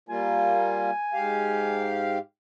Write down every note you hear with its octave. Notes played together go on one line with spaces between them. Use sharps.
G3 A#3 F4 G#5
G#2 G4 F5